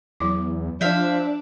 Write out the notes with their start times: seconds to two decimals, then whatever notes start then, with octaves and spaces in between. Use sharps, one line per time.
0.20 E2 F#3 E4 D6
0.81 F3 D4 C5 E5 F5